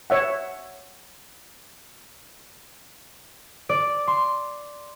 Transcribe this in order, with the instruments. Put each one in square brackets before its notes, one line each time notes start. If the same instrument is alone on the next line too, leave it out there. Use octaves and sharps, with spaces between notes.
[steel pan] C#5 E5 F#5
[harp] D5
C6